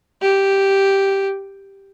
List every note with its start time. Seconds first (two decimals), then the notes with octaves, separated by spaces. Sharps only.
0.22 G4